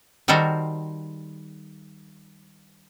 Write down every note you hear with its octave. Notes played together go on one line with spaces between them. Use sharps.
D#3 G3 F#4 A4 A#4 C5